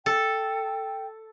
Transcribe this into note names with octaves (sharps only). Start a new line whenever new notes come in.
A4 G5